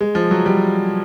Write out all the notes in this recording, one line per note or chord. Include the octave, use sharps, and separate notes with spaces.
G#3
F3
F#3
G3